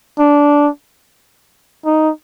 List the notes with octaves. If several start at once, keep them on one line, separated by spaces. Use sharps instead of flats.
D4
D#4